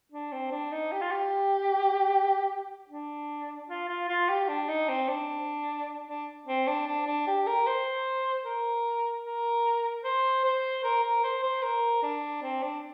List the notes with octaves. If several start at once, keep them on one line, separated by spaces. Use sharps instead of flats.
D4
C4
D4
D#4
G4
F4
G4
D4
F4
F4
F4
G4
D4
D#4
C4
D4
D4
C4
D4
D4
D4
G4
A#4
C5
A#4
A#4
C5
C5
A#4
A#4
C5
C5
A#4
D4
C4
D4